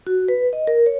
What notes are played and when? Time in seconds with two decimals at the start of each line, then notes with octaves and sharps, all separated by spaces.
0.07 F#4
0.28 B4
0.53 D#5
0.67 A#4
0.86 C#5